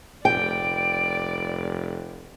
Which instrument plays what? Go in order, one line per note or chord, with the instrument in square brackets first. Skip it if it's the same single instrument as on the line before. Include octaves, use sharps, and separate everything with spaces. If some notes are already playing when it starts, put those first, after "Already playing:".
[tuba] F1 [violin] D5 [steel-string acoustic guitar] G5 [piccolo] D7